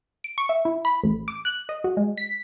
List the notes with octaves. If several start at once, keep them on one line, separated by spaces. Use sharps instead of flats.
D7
C#6
E5
E4
B5
A1
D6
F#6
D#5
F#4
G#3
B6